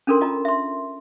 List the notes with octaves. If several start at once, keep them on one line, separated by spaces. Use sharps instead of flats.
C#4 D4 A4 A#4 C6
F4 D#5 A#5
E5 C6